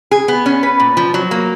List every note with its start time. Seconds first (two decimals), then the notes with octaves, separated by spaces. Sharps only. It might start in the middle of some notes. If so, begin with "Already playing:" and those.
0.11 G#4
0.28 B3
0.46 C#4
0.63 B4
0.80 A#2
0.97 F3
1.14 F#3
1.31 A#3